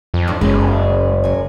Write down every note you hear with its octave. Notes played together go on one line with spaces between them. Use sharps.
F2
C4 D4 D#4
F#1 G#3 B3 C#4
F#2 G#5